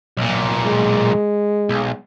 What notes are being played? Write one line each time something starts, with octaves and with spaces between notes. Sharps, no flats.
B1 A#2
G#3
B1